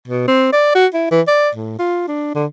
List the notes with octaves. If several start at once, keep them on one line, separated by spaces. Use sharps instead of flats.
B2
C4
D5
F#4
E4
E3
D5
A2
F4
D4
D3